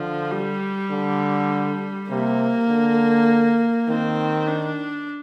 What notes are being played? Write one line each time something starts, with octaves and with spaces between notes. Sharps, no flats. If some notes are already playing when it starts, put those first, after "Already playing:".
Already playing: D3 F3
G3
D3
C3 A#3
D3
D#3 C4
D4